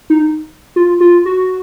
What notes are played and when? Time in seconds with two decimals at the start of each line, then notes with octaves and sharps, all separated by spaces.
0.10 D#4
0.76 F4
1.00 F4
1.25 F#4